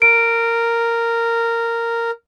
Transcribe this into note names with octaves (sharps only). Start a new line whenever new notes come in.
A#4 D7